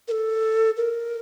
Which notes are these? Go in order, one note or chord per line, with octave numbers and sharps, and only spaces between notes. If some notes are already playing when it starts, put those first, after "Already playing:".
A#4
A4
A#4